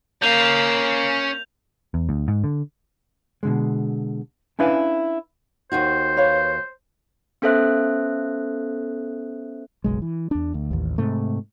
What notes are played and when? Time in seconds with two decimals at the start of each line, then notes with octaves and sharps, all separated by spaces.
0.22 A#3 C#4 F5 G6 F7
1.94 E2
2.09 D2
2.28 G#2
2.44 D3
3.43 B2 D3 G#3
4.59 C#4 D4 E4 B4 F5 G#5
5.72 D#2 D#4 F#4 C5
6.17 B4 C#5 F5
7.42 B3 C#4 A4 C5 E5 F#6
9.84 F#1 B1 G#3
10.02 E3
10.31 E2 D4
10.54 D2
10.71 A1 D#2
10.98 G#2 C3 A3